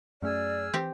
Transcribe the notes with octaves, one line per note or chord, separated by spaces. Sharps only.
F#2 A3 C#4 G#4 D5 E6 F6
E3 C4 G4